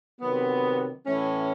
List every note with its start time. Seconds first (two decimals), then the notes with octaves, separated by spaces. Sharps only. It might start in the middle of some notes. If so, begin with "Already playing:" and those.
0.21 C3 D#3 F#3 B3
1.06 A2 E3 A3 C#4